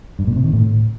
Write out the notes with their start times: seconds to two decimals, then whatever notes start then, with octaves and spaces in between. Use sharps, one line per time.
0.19 G2
0.27 A#2
0.36 C3
0.44 D#3
0.53 A2